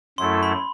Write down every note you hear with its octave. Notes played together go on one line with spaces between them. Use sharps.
F#2 F#3 A3 E4 A4 C6
B5